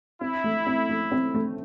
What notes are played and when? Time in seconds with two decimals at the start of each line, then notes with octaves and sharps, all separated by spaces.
0.21 C4 E4
0.44 A3
0.67 C4
0.89 A3
1.12 C4
1.34 A3